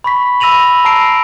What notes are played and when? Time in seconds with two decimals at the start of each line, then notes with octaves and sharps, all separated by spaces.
0.04 B5 C#6 B6
0.40 B5 E6 A#6 D#7 F7 F#7
0.85 A5 A#5 E6 A#6 C7 D7